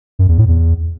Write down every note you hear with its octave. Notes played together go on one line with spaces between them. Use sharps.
F#2
E2
A2
E2